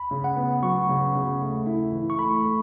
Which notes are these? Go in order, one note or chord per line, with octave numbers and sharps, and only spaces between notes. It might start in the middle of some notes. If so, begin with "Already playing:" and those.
Already playing: B5
C#3
F#5
B3
F#3 C#6
C#3
C#3
A3
E4
E3
C#6
A3 B5
A3